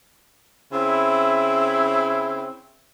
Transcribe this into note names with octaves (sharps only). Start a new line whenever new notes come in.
C#3 C4 E4